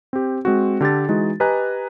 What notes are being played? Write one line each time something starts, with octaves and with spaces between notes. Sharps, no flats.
C4 G4
G#3 C4 F#4
D3 G4 A4 A6
E3 G#3 D#4 F#4
G4 B4 D#5 G#5 A#5 F#6